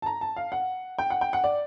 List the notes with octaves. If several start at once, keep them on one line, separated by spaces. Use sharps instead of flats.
A5
A#5
A5
F5
F#5
G5
F#5
G5
F#5
D5